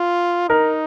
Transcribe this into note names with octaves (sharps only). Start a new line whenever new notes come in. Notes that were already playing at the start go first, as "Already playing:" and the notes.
Already playing: F4
D#4 A#4